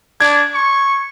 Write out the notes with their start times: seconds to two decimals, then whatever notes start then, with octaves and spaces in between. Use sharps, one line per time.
0.20 D4 G#6
0.54 C#6